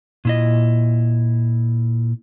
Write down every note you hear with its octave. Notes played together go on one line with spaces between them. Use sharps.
A#2 E4 D#5